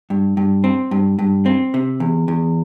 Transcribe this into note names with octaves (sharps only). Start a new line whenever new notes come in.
G2
G2
C4
G2
G2
C4
C3
E2
E2